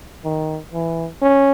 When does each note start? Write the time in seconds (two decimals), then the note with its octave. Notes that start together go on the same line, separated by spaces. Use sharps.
0.25 D#3
0.74 E3
1.22 C#4